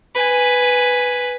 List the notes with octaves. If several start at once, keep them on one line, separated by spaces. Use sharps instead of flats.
B4 G#5